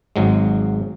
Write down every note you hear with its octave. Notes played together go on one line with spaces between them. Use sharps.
G#1 G#2 F#3 G#3